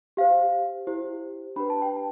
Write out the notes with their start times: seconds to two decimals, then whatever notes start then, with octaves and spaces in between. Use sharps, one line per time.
0.17 G4 C5 F5
0.87 E4 G4 C5
1.56 D4 G4 B4 B5
1.70 A5
1.82 G5
1.97 A5